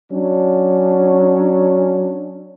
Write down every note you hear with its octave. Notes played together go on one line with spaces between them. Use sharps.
F#3 C#4 D4